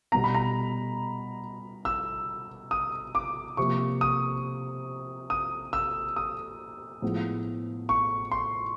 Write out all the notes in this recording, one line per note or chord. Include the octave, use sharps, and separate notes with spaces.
B2 G3 B3 A#5
B5
A#5
E6
D#6
D6
C3 F3 A#3 C#6
D#6
D#6
E6
D#6
A2 F3 G#3 B3
C#6
C6